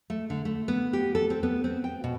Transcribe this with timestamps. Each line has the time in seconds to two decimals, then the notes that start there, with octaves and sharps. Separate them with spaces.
0.10 A3
0.30 D3
0.45 A3
0.68 B3
0.93 G4
1.15 A4
1.30 C4
1.43 B3
1.64 C4
1.84 G5
2.04 B2